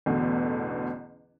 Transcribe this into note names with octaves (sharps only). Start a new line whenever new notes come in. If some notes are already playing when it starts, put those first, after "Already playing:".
A1 E2 B2 D3